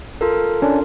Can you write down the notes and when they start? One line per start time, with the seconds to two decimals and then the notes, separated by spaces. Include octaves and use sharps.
0.21 F4 A4 A#4
0.62 C#4 D4